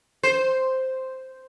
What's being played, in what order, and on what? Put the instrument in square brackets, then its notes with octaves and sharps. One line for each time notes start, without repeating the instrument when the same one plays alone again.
[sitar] C5